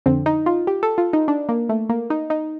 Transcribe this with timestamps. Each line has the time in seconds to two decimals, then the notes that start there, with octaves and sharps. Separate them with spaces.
0.06 F2 D3 C4
0.26 D#4
0.46 F4
0.67 G4
0.83 A4
0.98 F4
1.13 D#4
1.28 D4
1.49 A#3
1.69 A3
1.89 A#3
2.10 D#4
2.30 D#4